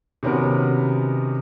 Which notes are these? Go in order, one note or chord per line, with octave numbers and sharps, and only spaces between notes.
C3 D#3 B3 C#4 F#4 A#4